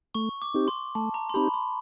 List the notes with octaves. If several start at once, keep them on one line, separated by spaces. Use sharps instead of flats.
A3 C#6
D6
C4 D#4 G4
C6
A3 A5
A#5
C6
C4 D#4 G4 B5
C6